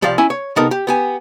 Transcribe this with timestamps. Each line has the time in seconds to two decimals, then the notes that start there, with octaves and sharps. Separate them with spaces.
0.02 C2 F3 G4 D5 F5
0.18 C#4 E4 G#5
0.30 C#5
0.56 C3 B3 D#4 A4 A#4
0.71 G4
0.87 B3 G4 G#5